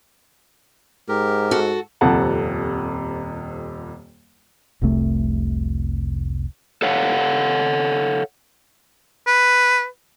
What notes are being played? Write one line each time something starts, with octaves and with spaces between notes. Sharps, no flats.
G#2 G4 A#4
F#4 A4
D#1 F2 C3 A4 F#5 A5
F1 C2 C3 A3
A4 C#5 F5 F#5
B4